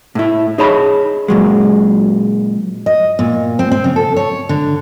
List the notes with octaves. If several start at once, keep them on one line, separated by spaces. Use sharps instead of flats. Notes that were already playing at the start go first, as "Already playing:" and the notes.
A2 E4
D#4 G#4 C#5 A5 B5
A#2 F#3 G#3
D#5
A#2
C4
C4
C#3
A4
C#5
D3